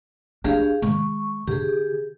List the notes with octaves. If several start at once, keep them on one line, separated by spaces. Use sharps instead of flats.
D4 E4 G4 G#4 F5
D#3 G#3 C#6
D3 G4 G#4